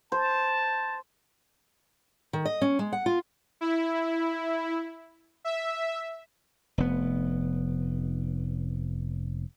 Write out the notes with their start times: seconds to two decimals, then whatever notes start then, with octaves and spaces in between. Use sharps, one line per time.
0.12 C5 A5
2.33 D#3
2.45 D#5
2.62 C#4
2.79 G#3
2.93 F#5
3.06 F4
3.61 E4
5.44 E5
6.78 F1 B3